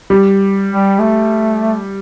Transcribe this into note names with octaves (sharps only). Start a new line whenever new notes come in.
G3
G3
A3